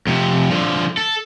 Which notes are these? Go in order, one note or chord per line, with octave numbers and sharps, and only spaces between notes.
F2 C3
D3 F3
A4